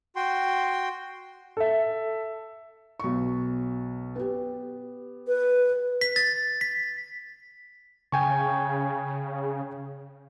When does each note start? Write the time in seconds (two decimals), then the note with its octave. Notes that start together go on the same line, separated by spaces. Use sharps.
0.16 F#4 G5 C6
1.57 A4 E5
3.00 B1 C#6
4.16 B3 G4
5.28 B4
6.01 B6
6.16 A6
6.61 B6
8.12 C#3 G5 G#5 C#6